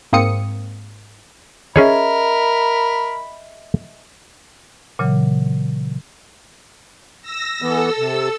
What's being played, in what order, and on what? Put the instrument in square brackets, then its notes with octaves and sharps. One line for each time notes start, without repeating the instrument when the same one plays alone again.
[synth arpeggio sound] G#2 A#3 C4 D#6 C#7
[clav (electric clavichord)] C#4 G#4 C#5 [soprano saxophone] A#4 [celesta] D#5 E5 [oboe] B5
[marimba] A#2 C#3 E3 F#3
[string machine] E6 A#6
[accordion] E3 B3 [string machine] A4 E6
[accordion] C3